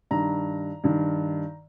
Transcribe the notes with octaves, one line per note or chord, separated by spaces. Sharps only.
G2 D#3 A#5
G2 D#3